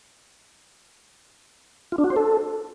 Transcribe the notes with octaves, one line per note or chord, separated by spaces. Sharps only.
F4
D4
F#4
C5
A4